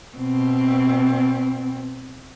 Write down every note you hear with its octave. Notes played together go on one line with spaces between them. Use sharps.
B2 C4